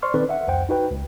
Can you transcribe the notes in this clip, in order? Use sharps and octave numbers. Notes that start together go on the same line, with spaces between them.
C5 D5 C6 C#6 F6
D#3 C4 D#4 A4 B4 D5
E5 F#5
C2 F2 C5 F#5 G5
D#4 F#4 B4 G5
C#2